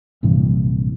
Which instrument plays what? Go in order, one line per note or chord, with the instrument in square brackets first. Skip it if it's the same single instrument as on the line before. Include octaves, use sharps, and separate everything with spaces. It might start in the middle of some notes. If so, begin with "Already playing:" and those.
[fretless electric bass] A#1 G2 C3 E3